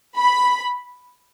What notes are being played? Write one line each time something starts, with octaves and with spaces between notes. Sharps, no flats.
B5